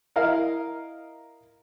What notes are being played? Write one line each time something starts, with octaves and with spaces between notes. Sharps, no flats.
E4 A#4 D#5 F5